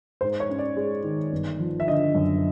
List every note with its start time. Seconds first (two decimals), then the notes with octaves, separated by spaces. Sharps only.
0.21 G#2 C5
0.40 C#5
0.49 C#4
0.58 D5
0.76 G#3
1.04 D#3
1.32 G1
1.60 F3
1.80 E5
1.87 D3 D#5
2.15 F#2